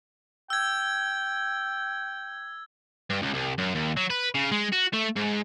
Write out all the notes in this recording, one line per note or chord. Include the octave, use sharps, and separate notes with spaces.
G5 E6 G#6
G2
C#2
C2
F#2
D#2
F#3
B4
C#3
G#3
F#4
A3
G#2